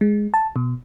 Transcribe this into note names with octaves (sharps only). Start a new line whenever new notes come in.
G#3
A5
B2